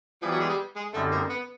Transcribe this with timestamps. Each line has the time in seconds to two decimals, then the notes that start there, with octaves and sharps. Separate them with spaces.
0.22 E3 F3 G3 B3 E4 G#4
0.31 F#3
0.40 G#3
0.49 G3
0.76 G#3
0.94 F#2 D3 G3 A3 C4 D#4
1.12 A#3
1.30 B3